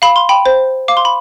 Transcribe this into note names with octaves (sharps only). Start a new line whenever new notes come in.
F5 B5
C6
G5 B5
C5
F5 D6
C6
B5